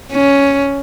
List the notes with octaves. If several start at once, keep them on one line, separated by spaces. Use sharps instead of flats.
C#4